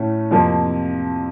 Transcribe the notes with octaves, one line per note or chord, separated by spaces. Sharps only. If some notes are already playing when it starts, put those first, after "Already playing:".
Already playing: A2 A3 C#4
F2 C3 F3 A#3